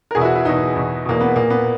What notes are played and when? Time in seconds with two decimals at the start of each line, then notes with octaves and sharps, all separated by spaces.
0.11 A#4
0.15 E2 B2 G#4
0.21 E4
0.25 F#4
0.35 E4
0.45 E2 B2 D#4
0.75 E2 B2
1.05 E2 B2 A#3
1.21 B3
1.35 A#2 A#3
1.50 B3